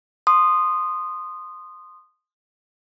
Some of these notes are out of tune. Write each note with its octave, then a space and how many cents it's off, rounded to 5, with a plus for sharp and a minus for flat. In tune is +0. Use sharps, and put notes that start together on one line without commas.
C6 +0 D#6 -15